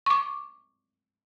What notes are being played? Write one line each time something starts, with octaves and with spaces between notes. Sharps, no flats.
C#6 D6